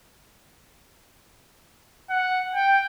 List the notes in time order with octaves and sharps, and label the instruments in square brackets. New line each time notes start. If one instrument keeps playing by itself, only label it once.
[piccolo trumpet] F#5
G5